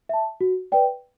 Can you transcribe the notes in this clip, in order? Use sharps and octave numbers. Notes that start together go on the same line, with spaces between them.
E5 A5
F#4
B4 D5 G5